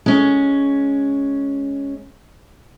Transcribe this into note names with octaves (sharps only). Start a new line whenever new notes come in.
G#3 C#4